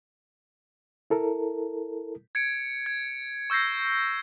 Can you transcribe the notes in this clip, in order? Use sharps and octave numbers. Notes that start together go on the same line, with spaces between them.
E4 A4 A#4
G#6 C#7 D7
G#6
C#6 E6 G6 A#6 C7